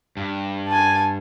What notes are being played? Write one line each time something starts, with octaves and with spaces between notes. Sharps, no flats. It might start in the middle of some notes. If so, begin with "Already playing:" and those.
G2
G#5 A5